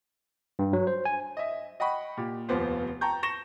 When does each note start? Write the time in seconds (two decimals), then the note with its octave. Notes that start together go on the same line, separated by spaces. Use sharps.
0.59 G2
0.73 F#3
0.87 C5
1.05 G#5
1.37 D#5 E5
1.80 D#5 F#5 G5 B5 C#6
2.17 A#2 G4
2.49 F1 D#2 F3 B3 C5
3.01 G5 A5 A#5 C#6 G6
3.23 C#6 A#6 E7 G7